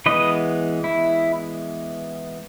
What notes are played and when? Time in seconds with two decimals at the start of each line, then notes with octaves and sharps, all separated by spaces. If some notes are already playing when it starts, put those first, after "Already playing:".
0.06 E3 G#3 B3 B4 D#5
0.84 E4